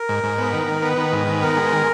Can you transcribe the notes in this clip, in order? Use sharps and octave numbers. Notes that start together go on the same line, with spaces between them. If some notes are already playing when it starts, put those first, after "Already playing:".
Already playing: A#4
G#2
G#2
B3
D#3
D#3
B3 B4
D#3
G#2
D#3
B3 A#4
G#3
D#3